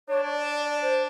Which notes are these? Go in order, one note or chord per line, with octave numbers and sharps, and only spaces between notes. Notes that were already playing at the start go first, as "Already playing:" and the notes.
D4 C#5
D5
D5
D5
C5